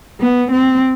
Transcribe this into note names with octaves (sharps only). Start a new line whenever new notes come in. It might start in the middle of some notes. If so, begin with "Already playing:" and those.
B3
C4